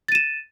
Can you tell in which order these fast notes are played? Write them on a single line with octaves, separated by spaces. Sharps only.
A6 D#7 E7